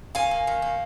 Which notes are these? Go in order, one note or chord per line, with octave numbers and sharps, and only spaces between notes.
D#3 F5 G#5
A#3
D#3
A#3